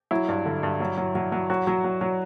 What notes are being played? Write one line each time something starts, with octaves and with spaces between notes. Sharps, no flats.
F#3 E4
G2
D3
G2
F#3
F#3
F#3
F#3
F#3 F#4
F#3
F#3
F#3